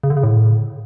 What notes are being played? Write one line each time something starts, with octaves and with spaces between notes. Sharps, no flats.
C#3
D3
C#3
A2